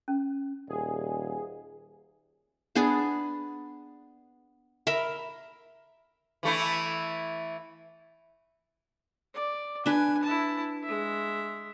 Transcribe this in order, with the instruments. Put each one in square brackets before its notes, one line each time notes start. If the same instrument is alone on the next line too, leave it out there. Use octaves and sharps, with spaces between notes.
[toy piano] C#4
[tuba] D#1 [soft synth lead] G#4
[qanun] B3 D4 G#4
A#4 E5 B5
[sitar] E3 A3 E4
[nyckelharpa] D5
[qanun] D4 B4 [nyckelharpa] G#5
[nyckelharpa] E4 A5
G#3 E5